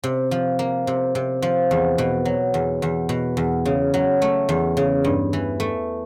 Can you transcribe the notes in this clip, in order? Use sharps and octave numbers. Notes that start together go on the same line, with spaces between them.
C3
F3
A#3
C3
C3
F3
E2
B2
F#3
E2
E2
B2
E2
C#3
F#3
A3
E2
C#3
G2
E3
A3